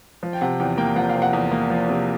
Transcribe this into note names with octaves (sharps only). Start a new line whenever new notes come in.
F3
G5
C3 F#5
E2 G5
A#3 G5
F3 F#5
F5
C3
F#5
E2
A#3
F3
C3